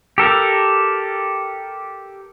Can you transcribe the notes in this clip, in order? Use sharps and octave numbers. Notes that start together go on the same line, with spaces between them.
G4 A4 A#4